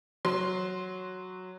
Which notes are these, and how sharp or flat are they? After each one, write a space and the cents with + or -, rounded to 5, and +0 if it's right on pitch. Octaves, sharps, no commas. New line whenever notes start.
F#3 +0 C6 +0